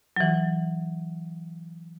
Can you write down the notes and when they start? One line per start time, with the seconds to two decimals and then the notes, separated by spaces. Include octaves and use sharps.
0.16 E3 F#3